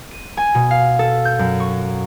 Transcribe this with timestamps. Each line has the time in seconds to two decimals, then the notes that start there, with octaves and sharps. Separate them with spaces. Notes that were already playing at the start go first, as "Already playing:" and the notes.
0.11 D#7
0.37 G#5
0.55 B2
0.71 F5
0.99 A4
1.25 G6
1.39 F#2
1.60 C#6